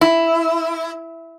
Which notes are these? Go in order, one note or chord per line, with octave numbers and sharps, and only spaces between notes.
E4